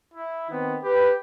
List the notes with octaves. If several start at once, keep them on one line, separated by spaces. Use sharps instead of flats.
E4
D#3 B3 C4
G4 B4